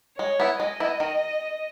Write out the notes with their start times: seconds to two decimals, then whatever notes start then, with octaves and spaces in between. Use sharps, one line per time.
0.18 G#3 C#5
0.40 B3 E4
0.60 G#3 D#5
0.80 B3 E4
1.00 D#3